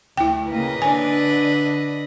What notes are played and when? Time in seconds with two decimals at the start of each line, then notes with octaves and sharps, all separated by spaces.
0.17 D2 A3 E4 G5
0.50 C#3 A#3 B4 D#5
0.82 D3 D4 G#5